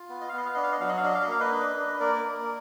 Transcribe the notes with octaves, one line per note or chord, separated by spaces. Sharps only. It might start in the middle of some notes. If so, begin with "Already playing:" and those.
Already playing: F4
B3
D#5
F5
B3 D#5
F5
D4 D#5
F5
D#5
F#3 F5
D#5
F5
D4 D#5
F5
D#5
A#3 F5
B4 D#5
D4
D4
D#5
A#3 A#4 D5
A#3